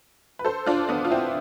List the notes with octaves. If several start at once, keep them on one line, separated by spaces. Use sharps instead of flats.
B4
A4 C5
D4 F4
B3 D4
F4
C4 E4